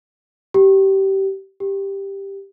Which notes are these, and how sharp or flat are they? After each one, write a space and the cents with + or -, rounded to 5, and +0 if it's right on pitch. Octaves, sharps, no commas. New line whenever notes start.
G4 -20
G4 +5